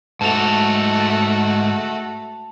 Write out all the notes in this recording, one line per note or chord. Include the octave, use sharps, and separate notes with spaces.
G#2 A3 F#4 A4 A5 F7